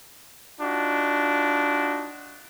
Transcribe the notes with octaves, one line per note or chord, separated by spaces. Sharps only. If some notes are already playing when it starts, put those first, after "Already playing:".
D4 D#4 F4 F#4